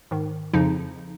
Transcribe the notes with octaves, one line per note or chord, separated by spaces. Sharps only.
G#2 D#3
F2 C#3 F3 D#4